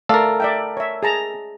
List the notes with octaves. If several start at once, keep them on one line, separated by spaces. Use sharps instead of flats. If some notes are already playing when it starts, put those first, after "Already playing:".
A3 A4 A#4 D5 F5
D5 E5 G5
C#5 E5
G#4 A5 A#5